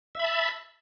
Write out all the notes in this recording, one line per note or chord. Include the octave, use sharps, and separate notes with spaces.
E5 A5 B5